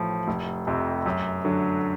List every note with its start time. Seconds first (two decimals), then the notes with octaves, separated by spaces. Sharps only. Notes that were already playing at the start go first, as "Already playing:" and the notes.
Already playing: A1 A2 F3
0.28 F1
0.67 F2 C3
1.06 F#2
1.45 D3 F#3